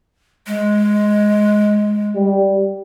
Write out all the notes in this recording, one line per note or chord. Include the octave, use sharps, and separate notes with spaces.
G#3
G3